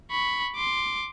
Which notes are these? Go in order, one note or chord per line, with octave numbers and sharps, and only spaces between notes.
B5 C#6
C6 D6